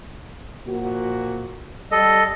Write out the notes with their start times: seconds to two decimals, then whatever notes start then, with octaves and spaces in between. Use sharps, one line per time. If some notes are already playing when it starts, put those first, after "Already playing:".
0.67 A#2 F3 F#4
1.91 G3 A4 D#5